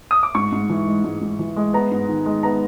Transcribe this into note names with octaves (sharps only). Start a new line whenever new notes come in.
D#6
D6
G#2 C#6
G#2
E3
G#3
G#2
G#2
E3
G#3
B3 A#5
G#2
D#3
G#3
B3 A#5